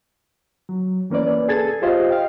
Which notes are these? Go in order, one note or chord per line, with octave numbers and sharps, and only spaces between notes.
F#3
E3 A#3 C#4 B4 D5
G#4 A4 G#6 A6
F4 G4 C5 D#5 F5
D#5 F5 G5